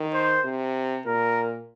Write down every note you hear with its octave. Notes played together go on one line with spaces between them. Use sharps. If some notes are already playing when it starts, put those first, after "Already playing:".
Already playing: D#3
C5
C3
A#2 A#4